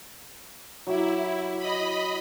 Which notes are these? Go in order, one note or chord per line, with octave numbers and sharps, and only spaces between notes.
F#3 E4 G4
D#5 B5